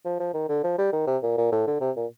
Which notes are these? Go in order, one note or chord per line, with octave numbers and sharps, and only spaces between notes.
F3
F3
D#3
D3
F3
G3
D#3
C3
A#2
A#2
A2
D3
C3
A#2